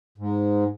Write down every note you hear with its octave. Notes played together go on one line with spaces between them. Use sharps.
G#2